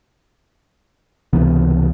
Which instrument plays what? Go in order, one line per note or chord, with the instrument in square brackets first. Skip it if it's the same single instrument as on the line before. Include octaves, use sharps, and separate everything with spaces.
[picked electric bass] C#2 C3 E3 B3